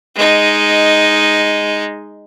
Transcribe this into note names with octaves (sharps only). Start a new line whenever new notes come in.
G#3 D#4